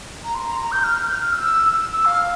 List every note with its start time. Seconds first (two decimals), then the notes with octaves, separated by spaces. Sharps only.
0.24 A#5
0.35 C6
0.47 A#5
0.59 A#5
0.71 G6
0.84 F6
1.08 G6
1.13 F6
1.32 E6
1.81 E6
2.05 F5